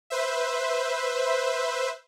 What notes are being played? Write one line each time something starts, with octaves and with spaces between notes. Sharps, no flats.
B4 C5 E5